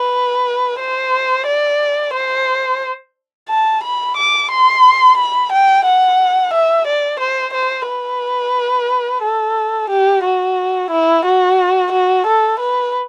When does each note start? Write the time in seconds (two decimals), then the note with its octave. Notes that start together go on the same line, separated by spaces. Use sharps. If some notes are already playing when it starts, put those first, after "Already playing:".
Already playing: B4
0.80 C5
1.47 D5
2.14 C5
3.49 A5
3.83 B5
4.16 D6
4.51 C6
5.17 B5
5.52 G5
5.85 F#5
6.54 E5
6.87 D5
7.20 C5
7.54 C5
7.89 B4
9.23 A4
9.90 G4
10.25 F#4
10.91 E4
11.25 F#4
11.92 F#4
12.27 A4
12.59 B4